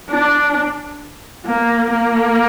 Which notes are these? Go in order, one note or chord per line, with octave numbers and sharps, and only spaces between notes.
D4
A#3
A#3